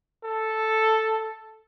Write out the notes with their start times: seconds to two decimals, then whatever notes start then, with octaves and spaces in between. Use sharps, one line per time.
0.24 A4